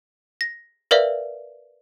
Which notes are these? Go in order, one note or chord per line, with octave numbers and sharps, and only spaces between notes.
A#6
A#4 B4 D5 E5 F5